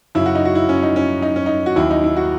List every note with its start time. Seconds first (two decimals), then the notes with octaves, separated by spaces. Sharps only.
0.15 F#2 C#3 F#3 E4
0.26 F#4
0.35 D#4
0.45 F#4
0.55 E4
0.69 C#4
0.83 D#4
0.96 C#4
1.22 D#4
1.36 C#4
1.46 D#4
1.66 F#4
1.76 D#2 D#3 F#3 E4
1.91 D#4
2.04 E4
2.17 F#4